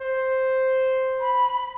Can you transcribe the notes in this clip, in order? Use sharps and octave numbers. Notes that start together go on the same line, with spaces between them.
C5
B5